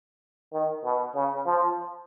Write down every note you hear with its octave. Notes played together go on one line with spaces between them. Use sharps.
D#3
B2
C#3
F3